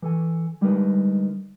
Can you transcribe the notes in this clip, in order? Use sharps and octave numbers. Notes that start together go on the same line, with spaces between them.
E3 A4 G#5
D3 G3 G#3 D#4 A#4 B4